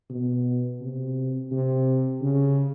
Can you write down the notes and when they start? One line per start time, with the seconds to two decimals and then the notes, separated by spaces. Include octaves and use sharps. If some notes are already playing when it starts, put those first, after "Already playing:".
0.10 B2
0.81 C3
1.51 C3
2.22 C#3